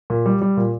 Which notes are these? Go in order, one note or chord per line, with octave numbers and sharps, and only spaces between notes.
A#2
G3
G3
A#2